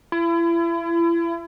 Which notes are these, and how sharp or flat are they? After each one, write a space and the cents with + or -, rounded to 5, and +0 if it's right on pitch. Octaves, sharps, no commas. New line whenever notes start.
E4 +35